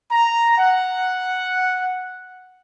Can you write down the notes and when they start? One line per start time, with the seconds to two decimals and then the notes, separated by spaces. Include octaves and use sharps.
0.12 A#5
0.58 F#5